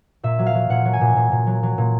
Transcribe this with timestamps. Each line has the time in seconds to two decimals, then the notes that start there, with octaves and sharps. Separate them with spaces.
0.23 A#2 E5
0.39 F#3
0.46 F5
0.55 F#3
0.69 A#2 F#5
0.85 F#3
0.93 G#5
1.01 A#2
1.16 A#2
1.32 A#2
1.47 F#3
1.63 F#3
1.78 A#2